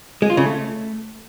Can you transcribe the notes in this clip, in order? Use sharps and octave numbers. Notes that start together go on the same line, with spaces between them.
G#3
F4
C#3
A3